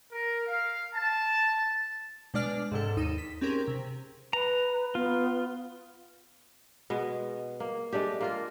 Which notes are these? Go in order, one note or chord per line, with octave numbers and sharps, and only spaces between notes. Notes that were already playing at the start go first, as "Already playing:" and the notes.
A#4
F5
A5
B2 G#3 D4 D5 F6 D7
G#2 C3 A4
D#2 D#4 D#7 E7
B6
C4 C#4 G4 G#4 A#4
C3
B4 A#5
B3 F4
B2 G#3 B3
A#3
G#3 A3 D4 G4
A#3 F4 A#4